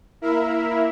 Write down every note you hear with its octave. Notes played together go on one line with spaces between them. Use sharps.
A#3 E4 A#4 E5